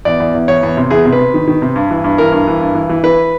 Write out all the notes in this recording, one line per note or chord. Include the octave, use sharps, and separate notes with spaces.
E2 D5
E2
E2
E2 C#5
E2
C3
E2 G#4
C3
B4
C3
D#3
D#3
C3
G2
E3
G2
E3 A#4
G2
E3
G2
E3
E3
E3 B4